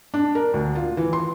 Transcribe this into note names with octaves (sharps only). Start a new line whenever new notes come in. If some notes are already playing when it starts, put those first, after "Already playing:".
D4
A#4
D2
F4
E3
C6